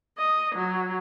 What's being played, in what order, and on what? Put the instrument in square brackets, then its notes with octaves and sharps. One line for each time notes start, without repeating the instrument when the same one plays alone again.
[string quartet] D#5
F#3